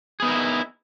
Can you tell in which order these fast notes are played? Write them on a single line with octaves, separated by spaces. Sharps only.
G#4 B3 D#4 A#4 E4